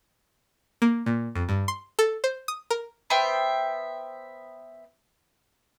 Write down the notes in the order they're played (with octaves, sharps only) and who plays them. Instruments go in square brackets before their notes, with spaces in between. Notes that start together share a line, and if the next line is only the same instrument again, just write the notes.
[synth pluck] A#3
A#2
F2
G2
C6
A4
C5
D#6
A#4
[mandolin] B3 C5 E5 G5